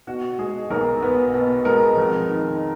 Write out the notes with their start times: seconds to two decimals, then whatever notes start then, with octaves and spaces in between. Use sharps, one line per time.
0.07 B2 F#4
0.39 G#3 G#4
0.70 B1 A#4
1.02 B3 B4
1.34 B2
1.65 G#3 A#4
1.97 F2
2.28 D#3